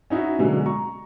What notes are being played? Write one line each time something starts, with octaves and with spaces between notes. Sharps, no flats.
C#4 D#4 E4 F#4
B2 D3 F#3 G#3
A#5 C#6